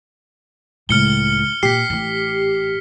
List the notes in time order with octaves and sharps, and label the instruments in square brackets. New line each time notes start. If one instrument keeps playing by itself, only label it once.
[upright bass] C#2 A2 [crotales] F6 C#7 G7
[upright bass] A#2 [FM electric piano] G4 [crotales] B6 C7
[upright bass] A1 A2